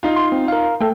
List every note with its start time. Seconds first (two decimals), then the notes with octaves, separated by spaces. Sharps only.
0.03 D#4 F4
0.16 C6
0.32 C4
0.48 A#4 F5
0.81 A3 A4 G5